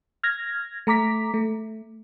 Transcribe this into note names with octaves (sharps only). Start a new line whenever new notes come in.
F6 G#6 A#6
A3 A#5 D6 B6
A3